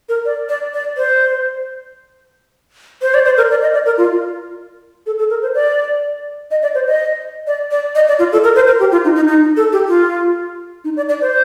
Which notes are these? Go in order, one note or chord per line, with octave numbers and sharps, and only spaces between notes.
A#4
D5
D5
D5
C5
C5
D5
C5
A#4
D5
D#5
D5
A#4
F4
A4
A4
A#4
C5
D5
D#5
D5
C5
D#5
D5
D5
D#5
D5
F4
A4
A#4
C5
A#4
G4
F4
D#4
D#4
D#4
A4
G4
F4
D#4
D5
D5
C5